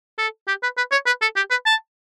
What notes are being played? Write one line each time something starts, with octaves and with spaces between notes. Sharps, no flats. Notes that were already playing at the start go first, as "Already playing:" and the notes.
A4
G4
B4
B4
C#5
B4
A4
G4
B4
A5